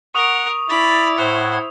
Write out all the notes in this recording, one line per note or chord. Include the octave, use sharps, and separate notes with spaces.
A#4 F#5 C#6 D#6 F7
E4 D5 B5 A6
A2 C5 F#5 G#6